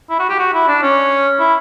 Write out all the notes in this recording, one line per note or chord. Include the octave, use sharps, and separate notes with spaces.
E4
F#4
G4
F#4
E4
D4
C#4
E4